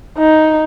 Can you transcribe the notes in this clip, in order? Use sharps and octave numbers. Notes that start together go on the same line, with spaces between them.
D#4